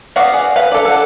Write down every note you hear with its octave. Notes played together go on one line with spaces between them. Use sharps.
B3 F#4 D5 F5
G#4
B4 F5 B5
A4 D5
A4 F#5